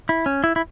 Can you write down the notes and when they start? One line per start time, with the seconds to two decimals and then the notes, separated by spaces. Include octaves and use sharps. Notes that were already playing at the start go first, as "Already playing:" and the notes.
0.09 E4
0.26 C#4
0.44 E4
0.56 E4